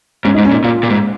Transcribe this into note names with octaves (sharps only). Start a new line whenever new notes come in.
G#2 C#4
D#4
G#2
C#4
A#2
D#4
A#2 F4
A#2
G#2